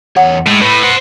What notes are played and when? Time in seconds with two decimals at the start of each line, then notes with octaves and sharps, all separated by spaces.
0.17 E2 C#5 F#5
0.47 A2 G#3
0.61 A2 B4
0.83 C5 F#5